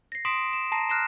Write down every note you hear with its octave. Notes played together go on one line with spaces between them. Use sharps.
A#6 C7
C6 D#6 B6 C7 D7 E7
E7
A5 A#5 A#6 C7
F6 F#6 A#6 C7 E7